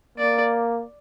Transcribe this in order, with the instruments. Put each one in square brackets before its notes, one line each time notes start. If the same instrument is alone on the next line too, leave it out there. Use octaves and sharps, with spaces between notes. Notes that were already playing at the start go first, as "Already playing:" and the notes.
[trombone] A#3 [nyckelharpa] D5